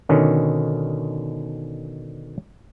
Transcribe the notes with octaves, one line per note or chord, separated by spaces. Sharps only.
B2 D3 D#3 C#4